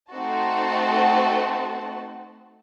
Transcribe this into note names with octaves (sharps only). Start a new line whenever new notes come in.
A3 C4 D#4 F#4 A5